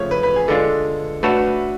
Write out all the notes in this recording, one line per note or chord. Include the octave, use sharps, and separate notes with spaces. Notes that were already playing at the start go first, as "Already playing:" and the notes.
Already playing: C#3 F3 A3 C#5
B4
B4
G#4
D3 G#3 D4 F4 A4
A3 D4 F#4 A4 B4 C#5